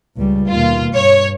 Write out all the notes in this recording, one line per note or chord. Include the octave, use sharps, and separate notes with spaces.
C#2 G3
D#2 B2 F4
G2 C#5